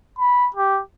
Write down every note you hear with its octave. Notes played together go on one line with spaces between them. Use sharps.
B5
G4